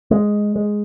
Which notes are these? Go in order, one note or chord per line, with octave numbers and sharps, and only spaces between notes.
G#3
G#3